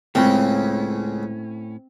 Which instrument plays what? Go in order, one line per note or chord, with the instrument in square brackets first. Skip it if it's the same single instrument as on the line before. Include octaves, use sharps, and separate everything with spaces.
[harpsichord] C#2 C#3 [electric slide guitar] A2 C#4 [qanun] C4